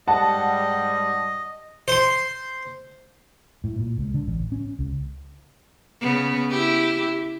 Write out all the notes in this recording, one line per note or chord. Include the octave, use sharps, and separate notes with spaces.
G#2 G3 D#5 F#5 A5
C5 C6
A2
A#2
C#2
D3
A1
C#4
C#2
C#3 B3
E4 G4